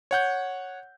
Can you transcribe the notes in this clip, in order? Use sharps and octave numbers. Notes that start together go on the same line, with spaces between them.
C#5 F#5 G6